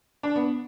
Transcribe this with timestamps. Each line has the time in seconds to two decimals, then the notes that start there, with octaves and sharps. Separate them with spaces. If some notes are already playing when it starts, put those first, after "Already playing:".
0.23 D4
0.36 B3